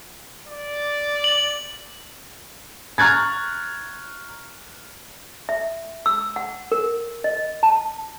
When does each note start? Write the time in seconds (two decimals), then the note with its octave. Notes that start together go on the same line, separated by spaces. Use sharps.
0.48 D5
1.24 F#7
2.98 A#5 C#6 F6 F#6 G#6 A6
5.49 E5
6.06 E6
6.36 F#5
6.72 A#4
7.24 D#5
7.63 A5